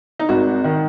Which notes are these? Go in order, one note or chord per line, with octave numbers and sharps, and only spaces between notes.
D#4
G#1 F#4
D#3